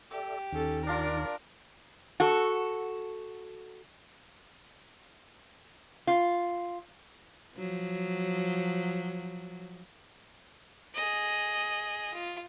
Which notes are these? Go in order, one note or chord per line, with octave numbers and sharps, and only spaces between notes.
G4 A4 D5 E5
D#2 D#3 C#4 A4
D4 F4 A#4 D5
F#4 A4
F4
F3 F#3
G#4 D#5
F4